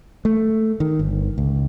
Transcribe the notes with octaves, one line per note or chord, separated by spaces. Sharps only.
A3
D#3
G1
C#2